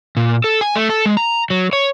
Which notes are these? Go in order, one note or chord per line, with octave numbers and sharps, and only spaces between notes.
A#2
A4
G#5
A3
A4
G#3
A#5
F#3
C#5